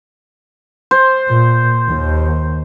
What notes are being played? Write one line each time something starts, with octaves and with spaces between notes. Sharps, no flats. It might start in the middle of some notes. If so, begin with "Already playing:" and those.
C5
A#2
D#2